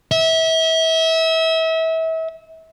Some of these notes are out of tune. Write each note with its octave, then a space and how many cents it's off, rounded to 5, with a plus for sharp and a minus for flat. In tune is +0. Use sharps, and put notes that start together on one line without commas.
E5 -30